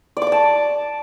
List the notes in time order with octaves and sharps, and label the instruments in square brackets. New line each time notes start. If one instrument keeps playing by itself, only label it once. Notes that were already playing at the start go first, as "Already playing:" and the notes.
[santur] D5
D6
D5
A5